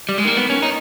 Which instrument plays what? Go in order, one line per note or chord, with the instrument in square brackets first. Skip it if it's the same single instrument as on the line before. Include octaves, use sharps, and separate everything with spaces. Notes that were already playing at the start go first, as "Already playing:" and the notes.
[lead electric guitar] G3
G#3
[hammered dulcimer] D#3 [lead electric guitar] A#3
[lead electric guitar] B3
C#4
D#4